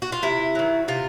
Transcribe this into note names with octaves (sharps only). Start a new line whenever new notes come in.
F#4
F4
C3 E4
D#3 F#3
C3 F4